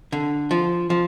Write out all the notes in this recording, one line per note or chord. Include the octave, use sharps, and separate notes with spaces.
D3
F3
F3